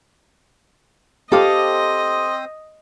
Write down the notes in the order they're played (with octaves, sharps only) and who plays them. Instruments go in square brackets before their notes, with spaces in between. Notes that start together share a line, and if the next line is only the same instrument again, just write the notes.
[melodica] C4 C5 D#6 [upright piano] G4 D6 [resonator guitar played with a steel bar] A4 F5 [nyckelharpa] D#5